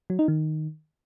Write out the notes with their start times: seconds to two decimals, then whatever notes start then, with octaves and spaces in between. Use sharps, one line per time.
0.10 F#3
0.19 D#4
0.28 D#3